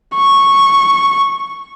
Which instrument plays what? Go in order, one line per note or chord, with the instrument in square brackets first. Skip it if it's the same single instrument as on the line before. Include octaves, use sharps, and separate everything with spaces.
[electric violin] C#6